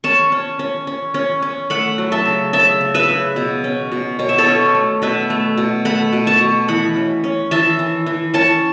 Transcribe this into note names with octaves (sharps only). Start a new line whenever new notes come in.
C#4 A5 C#6
C#4
C#4
C#4
C#4
C#4
A3 F#5 B5
F#3
E5 A5
C#3
C#3 E5 A5
C#3
B4 E5
C#3
B2
C#4
B2
B2 C#5
E5
A4 C#5
C#4
A3
B2 B4 E5
A3
B2
A3 F#5 B5
B2
A5 C#6
B2
E3 F#5 B5
C#4
C#4
E3 E5 A5
E3
E3
C#4 A5 C#6